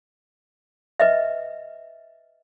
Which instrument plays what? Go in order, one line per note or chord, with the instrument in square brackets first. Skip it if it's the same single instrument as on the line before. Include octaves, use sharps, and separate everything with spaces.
[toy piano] B4 D#5 E5